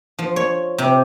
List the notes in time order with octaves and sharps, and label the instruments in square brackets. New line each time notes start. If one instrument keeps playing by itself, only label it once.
[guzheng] F3
C#5
C3